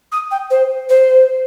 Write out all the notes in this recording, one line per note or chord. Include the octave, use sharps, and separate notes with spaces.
D#6
G5
C5
C5